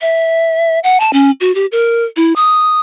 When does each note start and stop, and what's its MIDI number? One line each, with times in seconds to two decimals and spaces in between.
0.01 0.79 76
0.84 1.00 78
1.00 1.11 81
1.13 1.31 61
1.41 1.54 66
1.55 1.66 67
1.72 2.05 70
2.17 2.35 64
2.36 2.80 87